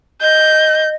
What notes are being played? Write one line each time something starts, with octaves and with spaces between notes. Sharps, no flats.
D#5 G6